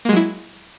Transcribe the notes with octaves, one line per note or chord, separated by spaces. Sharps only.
F#3 G#3 A#3 E4